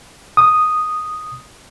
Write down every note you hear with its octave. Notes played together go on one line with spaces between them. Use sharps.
D#6